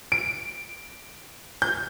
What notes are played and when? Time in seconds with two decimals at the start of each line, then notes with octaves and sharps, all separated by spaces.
0.12 D7
1.62 G6